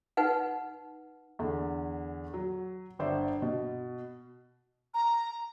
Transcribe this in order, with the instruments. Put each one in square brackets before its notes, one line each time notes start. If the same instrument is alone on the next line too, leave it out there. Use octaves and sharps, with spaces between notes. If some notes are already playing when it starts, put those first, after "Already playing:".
[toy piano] D#4 B4 F#5
[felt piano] E2 D3
F#3
G1 C5 D5 E5
B2
[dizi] A#5